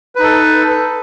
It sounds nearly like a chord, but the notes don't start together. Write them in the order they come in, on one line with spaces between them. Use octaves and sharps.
B4 D#4 A4